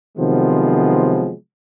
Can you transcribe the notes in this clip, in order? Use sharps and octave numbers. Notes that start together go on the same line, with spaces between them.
C3 D#3 F3 F#3 G#3 B3